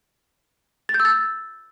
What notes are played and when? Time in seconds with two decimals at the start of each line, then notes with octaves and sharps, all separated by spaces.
0.89 A6
0.94 G6
1.00 E6
1.05 A6